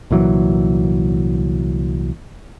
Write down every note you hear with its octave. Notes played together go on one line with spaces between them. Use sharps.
C2 A#2 E3 F#3